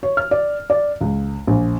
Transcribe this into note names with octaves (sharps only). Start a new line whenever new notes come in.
C#5
F6
D5
D5
C#2
A#1